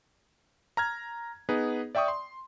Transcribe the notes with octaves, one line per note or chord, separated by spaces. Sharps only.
A#5 F6 G#6
B3 D#4 G#4 B4
D5 E5 G5 C#6 D#6
C6